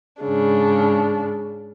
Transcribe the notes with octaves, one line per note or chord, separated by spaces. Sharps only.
G#2 C#3 D4